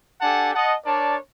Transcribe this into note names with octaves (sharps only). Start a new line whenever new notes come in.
D4 G4 A4 F#5 G#5 A5
D#5 F#5 A5
D4 A#4 C#5 D5 A5